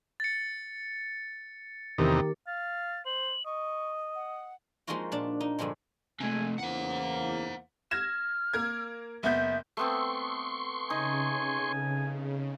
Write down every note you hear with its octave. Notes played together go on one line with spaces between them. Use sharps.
A6 C#7
E2 C3 D#3 D#4 G4 A#4
F5 A6
C5 F#7
D#5 C#6
F#5
F3 G#3 A#3 D#4 F4 F#4
A#2 D4 A5
A#3 D#4
G2 A#2 D3 F3 G#3
A#1 C3 G#3 A3 G#5
E2 C#3 A#3 C5 F#5
F6 G#6 A#6 E7
A#3 A#4 G#6
F#1 B3 E5 G6
A3 B3 C4 C6 C#6
C#3 D#4 G#5